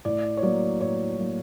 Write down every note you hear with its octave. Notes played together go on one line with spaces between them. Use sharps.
A2 D5
C#5
F#3 A#3 D5
A2 C#5
F#3 A#3